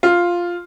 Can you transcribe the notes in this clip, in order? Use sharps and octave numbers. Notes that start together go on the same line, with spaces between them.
F4